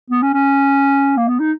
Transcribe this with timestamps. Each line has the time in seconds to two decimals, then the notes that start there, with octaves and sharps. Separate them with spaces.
0.10 B3
0.22 C#4
0.33 C#4
1.17 A#3
1.28 B3
1.40 D#4